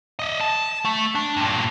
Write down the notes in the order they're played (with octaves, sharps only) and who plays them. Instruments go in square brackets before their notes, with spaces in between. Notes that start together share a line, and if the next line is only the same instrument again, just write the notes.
[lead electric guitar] D#5 E5
A5
A3
D4
G2 A#2